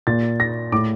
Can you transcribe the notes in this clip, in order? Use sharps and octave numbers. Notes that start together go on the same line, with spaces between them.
A#2 A6
A#6
A2 D6